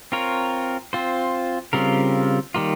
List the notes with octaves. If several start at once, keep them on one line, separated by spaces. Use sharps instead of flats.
C4 F4 A#4 C#5
C4 F4 C5
C#3 G3 C4 F4 A#4
D#3 G3 A#3 F4